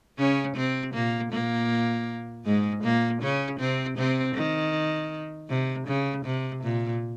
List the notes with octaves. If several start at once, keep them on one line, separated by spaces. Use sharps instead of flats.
C#3 C#4
C3 C4
A#2 A#3
A#2 A#3
G#2 G#3
A#2 A#3
C#3 C#4
C3 C4
C3 C4
D#3
C3
C#3
C3
A#2